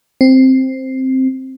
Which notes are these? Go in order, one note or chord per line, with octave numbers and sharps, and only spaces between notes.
C4